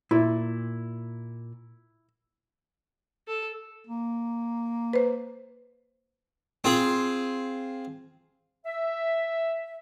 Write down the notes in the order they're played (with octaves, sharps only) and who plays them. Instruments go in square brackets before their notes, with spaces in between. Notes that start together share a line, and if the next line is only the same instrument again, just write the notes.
[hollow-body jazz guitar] A#2 [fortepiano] E4
[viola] A4
[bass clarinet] A#3
[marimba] B4 C5
[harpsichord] C4 F4 G#4
[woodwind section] E5